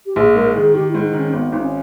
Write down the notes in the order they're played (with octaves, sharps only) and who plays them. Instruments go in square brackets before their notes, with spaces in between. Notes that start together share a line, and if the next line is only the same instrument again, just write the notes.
[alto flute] G4
[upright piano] A#1 [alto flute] G#4
[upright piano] G#2 [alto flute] A#4
[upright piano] D#3 [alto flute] G#4
[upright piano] D#3 [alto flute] G4
[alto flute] E4
[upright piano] G#2
[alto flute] D#4
[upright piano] D#3 [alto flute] C#4
[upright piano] G#1 [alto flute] B3
[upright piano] G#1 [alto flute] D#4
[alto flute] C#4